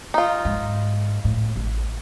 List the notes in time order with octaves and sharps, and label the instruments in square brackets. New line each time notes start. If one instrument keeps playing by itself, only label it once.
[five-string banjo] D#4 F4
[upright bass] G#2
A2
A1